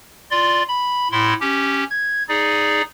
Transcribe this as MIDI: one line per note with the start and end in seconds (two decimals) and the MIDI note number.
0.31 0.63 65
0.31 0.63 74
0.31 0.63 84
0.69 1.08 83
1.11 1.34 45
1.11 1.34 64
1.11 1.34 84
1.41 1.84 61
1.41 1.84 67
1.90 2.23 92
2.29 2.82 63
2.29 2.82 68
2.29 2.82 74